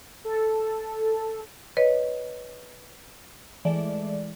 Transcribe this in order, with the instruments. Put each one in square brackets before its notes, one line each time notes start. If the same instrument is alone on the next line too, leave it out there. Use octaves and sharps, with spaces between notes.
[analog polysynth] A4
[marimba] B4 C#5 D#5
[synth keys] E3 G#3 A3 D5